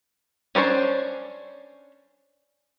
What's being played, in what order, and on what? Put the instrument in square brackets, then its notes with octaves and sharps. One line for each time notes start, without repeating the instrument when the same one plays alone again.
[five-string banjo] C#4 D4 C5 C#5